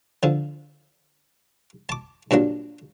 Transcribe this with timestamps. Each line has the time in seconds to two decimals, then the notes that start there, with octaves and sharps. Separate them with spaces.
0.23 D3 F3
1.89 A5 D6
2.31 G2 A#2 F#3 D4